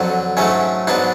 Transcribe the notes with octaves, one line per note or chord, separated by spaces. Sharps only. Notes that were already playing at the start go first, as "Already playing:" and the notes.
Already playing: F2 D3 F#3
G#2 F#3 A3 C#4
G#2 F#3 B3 D4